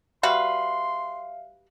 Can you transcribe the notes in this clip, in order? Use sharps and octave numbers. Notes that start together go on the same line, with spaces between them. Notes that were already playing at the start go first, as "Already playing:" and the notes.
G3 F#4 B4 E5 F5 C6